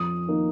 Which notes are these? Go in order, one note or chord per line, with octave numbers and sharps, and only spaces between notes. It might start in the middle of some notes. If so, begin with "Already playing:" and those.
Already playing: F2 D#6
D#3 A#3 D#4